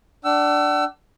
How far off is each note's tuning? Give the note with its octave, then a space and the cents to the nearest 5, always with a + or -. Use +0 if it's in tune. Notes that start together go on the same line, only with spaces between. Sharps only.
D4 +0 F#5 +40 E6 +20